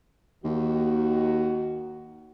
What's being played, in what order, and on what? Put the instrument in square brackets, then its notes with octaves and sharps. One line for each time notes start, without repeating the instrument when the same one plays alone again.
[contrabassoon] D#2 [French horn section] D#3 F#4